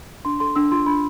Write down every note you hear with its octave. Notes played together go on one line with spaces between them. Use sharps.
D4 C6
A4 C6
D4 E6
F4 C6
D4 B5